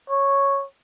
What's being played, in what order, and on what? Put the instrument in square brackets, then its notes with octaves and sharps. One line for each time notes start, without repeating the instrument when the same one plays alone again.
[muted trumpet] C#5